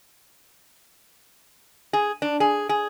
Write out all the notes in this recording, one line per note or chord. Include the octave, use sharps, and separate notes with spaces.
G#4
D4
G#4
G#4